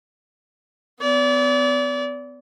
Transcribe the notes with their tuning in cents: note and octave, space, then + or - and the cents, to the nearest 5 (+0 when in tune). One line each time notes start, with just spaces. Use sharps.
B3 +35 D5 -35